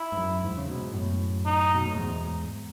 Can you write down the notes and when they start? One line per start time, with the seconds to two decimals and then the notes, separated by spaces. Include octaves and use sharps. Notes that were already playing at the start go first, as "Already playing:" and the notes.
Already playing: E4
0.12 G#2
0.17 F#2
0.43 E2 G#2
0.57 C#3
0.69 G#2 B2
0.94 F#2 A2
1.45 D#4
1.74 B2
1.86 A2
1.97 E2 G#2